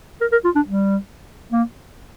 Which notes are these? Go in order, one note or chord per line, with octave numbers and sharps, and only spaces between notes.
A#4
A#4
F4
D4
G3
A#3